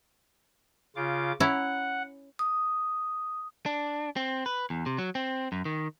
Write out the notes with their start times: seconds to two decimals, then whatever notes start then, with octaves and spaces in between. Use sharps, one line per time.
0.96 C#3 F4 D6
1.40 C#4 E4 F#5 A#5
2.39 D#6
3.66 D4
4.16 C4
4.46 B4
4.70 E2
4.86 C3
4.98 F#3
5.15 C4
5.52 F#2
5.65 D#3